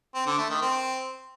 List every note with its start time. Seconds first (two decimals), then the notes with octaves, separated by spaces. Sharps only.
0.14 C4
0.26 D3
0.38 A3
0.50 D#3
0.61 C4